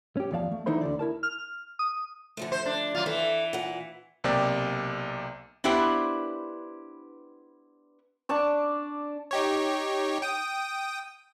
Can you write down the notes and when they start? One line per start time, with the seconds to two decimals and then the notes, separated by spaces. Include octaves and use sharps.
0.17 C#4 G4
0.32 E2 F3 D5 F5 A5
0.51 A3
0.66 D3 E3 D#4 E4 C5 B5
0.81 D2 D3 D5
0.99 E4 A#4 A5
1.23 F6
1.79 D#6
2.37 D3 F3 A3
2.52 C5
2.66 D4
2.95 F#3 F4
3.06 E3 E4 A4
3.53 A#2 F#5
4.24 B1 C3 A#3 G4 D5
5.64 B3 D4 E4 G4 B4 C5
8.29 D4 D5 A5 C#6
9.31 D#4 G4 C#5
10.22 G5 D#6